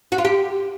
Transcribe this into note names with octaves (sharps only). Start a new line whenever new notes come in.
F#4
F4
G4